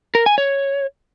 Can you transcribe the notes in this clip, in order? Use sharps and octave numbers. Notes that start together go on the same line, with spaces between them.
A#4
G#5
C#5